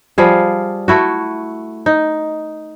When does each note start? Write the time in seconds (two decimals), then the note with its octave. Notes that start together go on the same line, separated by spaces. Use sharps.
0.18 F3 G3 G#4 F5
0.88 A3 E4 F#4
1.86 D#4